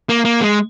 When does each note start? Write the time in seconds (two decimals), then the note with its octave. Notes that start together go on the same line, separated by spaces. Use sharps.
0.09 A#3
0.25 A#3
0.41 G#3